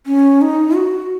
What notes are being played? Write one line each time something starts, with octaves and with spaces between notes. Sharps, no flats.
C#4
D#4
F#4